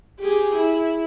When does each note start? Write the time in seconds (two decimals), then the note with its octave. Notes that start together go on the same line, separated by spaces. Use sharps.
0.20 G4 G#4
0.55 E4